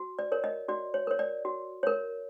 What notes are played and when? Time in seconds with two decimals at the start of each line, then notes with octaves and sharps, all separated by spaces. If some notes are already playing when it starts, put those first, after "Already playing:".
Already playing: F#4
0.19 D5
0.32 A#4 C#5
0.44 D#5
0.69 F#4 D5
0.94 C#5
1.07 A#4 C#5
1.19 D5
1.45 F#4
1.83 A#4 C#5